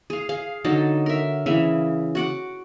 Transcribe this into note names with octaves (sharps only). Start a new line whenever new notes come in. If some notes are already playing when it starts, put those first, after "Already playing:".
G#4 F5
G#4 F5
D3 F#3 D#4 A5
A#4 E5
C#3 E3 E5
F#4 F#5 D6